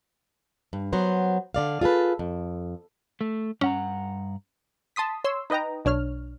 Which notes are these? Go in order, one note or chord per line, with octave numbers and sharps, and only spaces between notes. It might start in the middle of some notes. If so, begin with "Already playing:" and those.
G2
F#3 B3 C5
D3 D5 F5
F4 G#4 A4 B4
F2
A3
G2 C#4 F#5 A#5
A5 C6 D#6 B6
C#5 C6 E6
D#4 B4 D#5 G5 A#5
B1 D4 C#5 F6